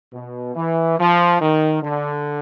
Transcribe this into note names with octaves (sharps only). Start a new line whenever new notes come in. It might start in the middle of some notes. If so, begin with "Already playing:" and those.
B2
E3
F3
D#3
D3